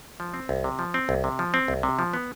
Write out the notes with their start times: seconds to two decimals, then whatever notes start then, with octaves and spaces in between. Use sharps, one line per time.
0.20 F3
0.34 C4
0.49 C2
0.64 C3
0.79 F3
0.94 C4
1.09 C2
1.24 C3
1.39 F3
1.54 C4
1.68 C2
1.83 C3
1.99 F3
2.14 B3